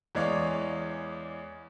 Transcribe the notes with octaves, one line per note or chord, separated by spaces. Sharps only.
E2 E3 G#3 C#5 D5 F5